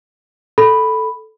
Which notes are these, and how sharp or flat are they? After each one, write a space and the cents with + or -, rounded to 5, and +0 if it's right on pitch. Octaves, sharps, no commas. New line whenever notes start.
A4 -5 B5 +0